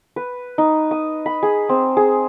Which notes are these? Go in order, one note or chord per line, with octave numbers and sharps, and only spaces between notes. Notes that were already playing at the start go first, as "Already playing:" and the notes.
B4
D#4
D#6
B5
G#4
C4
G#4